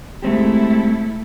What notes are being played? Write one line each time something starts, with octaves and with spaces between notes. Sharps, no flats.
G#3 A3 C4 E4 G4